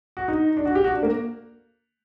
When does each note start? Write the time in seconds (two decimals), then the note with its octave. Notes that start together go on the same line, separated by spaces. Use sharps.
0.17 F#4
0.28 D#4
0.57 D4
0.65 F#4
0.75 G4
0.84 F#4
0.94 D4
1.03 A#3